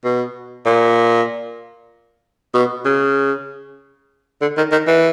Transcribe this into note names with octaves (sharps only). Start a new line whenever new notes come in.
B2
A#2
B2
C#3
D3
D#3
D#3
E3